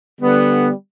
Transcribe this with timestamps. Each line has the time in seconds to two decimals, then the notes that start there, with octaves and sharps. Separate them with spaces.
0.21 D3 G3 B3